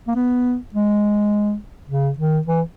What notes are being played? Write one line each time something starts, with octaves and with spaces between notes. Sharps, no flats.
A#3
B3
G#3
C#3
D#3
E3